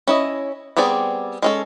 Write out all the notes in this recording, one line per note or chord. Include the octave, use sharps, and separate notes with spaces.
C#4 E4 D#5
G3 B3 C4 G#4 D5
G#3 C#4 A4